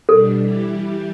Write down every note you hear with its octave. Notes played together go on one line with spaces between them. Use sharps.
B2 G3 D4 A4
E3 G3 E4 G4